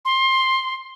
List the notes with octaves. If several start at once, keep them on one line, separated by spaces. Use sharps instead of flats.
C6